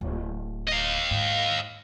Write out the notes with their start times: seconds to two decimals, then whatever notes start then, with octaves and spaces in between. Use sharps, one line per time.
0.01 D1
0.69 D#5 F5
1.11 G#2